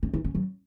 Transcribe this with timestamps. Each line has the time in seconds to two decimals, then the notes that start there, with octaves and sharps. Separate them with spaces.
0.03 C#4
0.14 E4
0.24 C#4
0.35 F#3